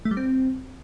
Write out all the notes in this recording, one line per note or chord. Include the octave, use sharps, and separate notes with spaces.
A3
G3
C4